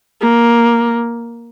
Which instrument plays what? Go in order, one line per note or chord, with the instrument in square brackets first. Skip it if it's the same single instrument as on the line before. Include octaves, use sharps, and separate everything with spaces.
[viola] A#3